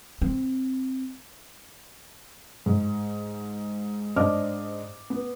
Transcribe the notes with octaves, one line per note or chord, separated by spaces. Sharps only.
C4
G#2
G#2 D4 C5 D#5 D6 F6
B3